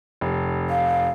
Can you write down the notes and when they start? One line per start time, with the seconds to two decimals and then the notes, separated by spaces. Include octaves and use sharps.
0.21 F1
0.70 F5